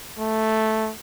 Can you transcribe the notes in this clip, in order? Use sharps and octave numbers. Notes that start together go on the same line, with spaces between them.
A3